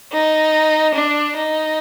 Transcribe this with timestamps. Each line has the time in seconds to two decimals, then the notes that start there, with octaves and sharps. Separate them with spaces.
0.13 D#4
0.94 D4
1.37 D#4